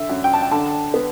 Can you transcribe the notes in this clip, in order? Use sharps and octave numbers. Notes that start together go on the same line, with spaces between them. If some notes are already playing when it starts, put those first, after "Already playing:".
Already playing: D3 E5
F#2
G5
A5
G5
D3 A5
B3